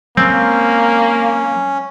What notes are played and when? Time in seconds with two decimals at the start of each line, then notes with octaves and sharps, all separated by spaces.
0.17 F#3 G#3 A#3 C4 C#4